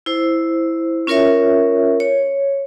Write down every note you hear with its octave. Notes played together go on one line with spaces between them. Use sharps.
E4 C5
C#4 F4 A#4 C#5 E5
C#5